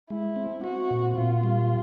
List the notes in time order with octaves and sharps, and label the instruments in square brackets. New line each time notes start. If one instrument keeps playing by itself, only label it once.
[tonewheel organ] G#3 [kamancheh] E4
[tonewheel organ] C4
[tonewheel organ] C4 [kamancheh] F#4
[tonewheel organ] A#2
[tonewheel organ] A#2 [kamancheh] F4
[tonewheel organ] G3